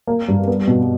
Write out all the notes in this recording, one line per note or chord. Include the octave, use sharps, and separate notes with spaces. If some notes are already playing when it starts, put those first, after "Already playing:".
A#3
G2
B3
B2